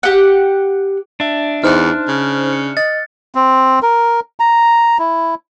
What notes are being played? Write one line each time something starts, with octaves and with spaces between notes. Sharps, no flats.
G4 F#5
D4 E5
E2 D#4 C5 F6 F#6
C#3
C#7
D#5 A6
C4
A#4
A#5
E4